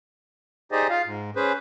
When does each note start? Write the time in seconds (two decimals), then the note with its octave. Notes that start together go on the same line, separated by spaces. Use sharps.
0.72 D#4 G4 G#4 C5 D5 D#5
0.90 F4 F5
1.05 G#2
1.36 C#4 G#4 B4 C5